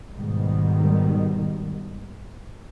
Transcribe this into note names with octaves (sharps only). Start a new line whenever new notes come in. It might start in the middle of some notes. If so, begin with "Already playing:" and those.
G#2 B2 D#3 G3